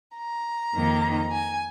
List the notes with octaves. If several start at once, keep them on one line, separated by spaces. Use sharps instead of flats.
A#5
F2 D#3 A#3 D#4
G#5